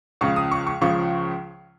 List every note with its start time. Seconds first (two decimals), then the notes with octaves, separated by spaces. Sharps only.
0.21 C#2 C#3 F3 C#6
0.36 D#6
0.52 C#6
0.67 C#6
0.81 C#2 C#3 F3 C#6